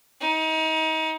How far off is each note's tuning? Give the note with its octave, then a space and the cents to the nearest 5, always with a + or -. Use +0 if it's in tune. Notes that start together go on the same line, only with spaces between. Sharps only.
D#4 +30